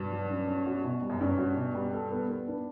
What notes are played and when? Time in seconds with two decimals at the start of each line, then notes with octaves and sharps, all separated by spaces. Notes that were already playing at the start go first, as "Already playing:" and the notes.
Already playing: G2 B2 B4
0.12 F#3
0.30 C#4
0.47 C#4
0.66 F#4
0.84 B2
1.02 G3
1.10 F#2
1.20 G2 C#4
1.38 F#4
1.56 B2
1.75 G3
1.93 A4
2.11 B3
2.30 B3
2.48 D4